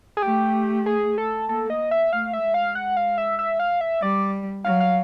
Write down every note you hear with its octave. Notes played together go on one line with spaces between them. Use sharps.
G#4
A3 G4
G#4
A4
A#3 A4
D#5
E5
A3 F5
E5
G#3
F5
F#5
F5
E5
E5
F5
E5
G3 D5
F#3 F5
F5